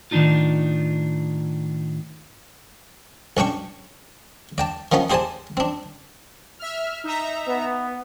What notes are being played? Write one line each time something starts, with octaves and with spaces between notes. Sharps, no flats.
A2 D#3 G#3 D4 D#4 F4
B1 C#4 D4 G5 C#6
D5 G5 A5
D#3 F3 B3 C#4 D#4
G4 G#4 C5 D5 G#5 A5
C4 D4
E5 F6
D#4 E5 A#5
B3